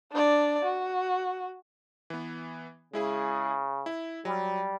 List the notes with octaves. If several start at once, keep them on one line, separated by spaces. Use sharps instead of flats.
D4 D5
F#4
E3 B3
C#3 G#3 E4 G#4
E4
F#3 G3